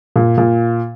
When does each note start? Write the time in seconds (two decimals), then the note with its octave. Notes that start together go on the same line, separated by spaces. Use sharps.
0.16 A#2
0.38 A#2